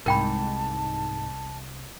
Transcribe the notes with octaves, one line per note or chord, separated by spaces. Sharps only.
C2 G#2 A#4 G5 A5 B5